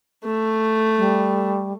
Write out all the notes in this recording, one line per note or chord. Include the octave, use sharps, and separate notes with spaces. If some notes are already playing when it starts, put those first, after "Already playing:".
A3
G3